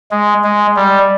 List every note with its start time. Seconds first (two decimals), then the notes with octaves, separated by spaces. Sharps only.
0.11 G#3
0.44 G#3
0.76 G3